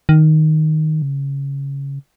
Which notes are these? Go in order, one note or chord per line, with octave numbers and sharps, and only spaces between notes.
D#3
C#3